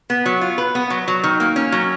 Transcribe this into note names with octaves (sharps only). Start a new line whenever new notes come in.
B3
F#3
F4
B4
B3
F#3
F#3
D#3
A#3
C#4
F#3